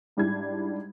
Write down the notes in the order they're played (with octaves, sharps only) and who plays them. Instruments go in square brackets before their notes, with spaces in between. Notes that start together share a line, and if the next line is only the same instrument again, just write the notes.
[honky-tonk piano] G#2 G3 D4 E4 G#6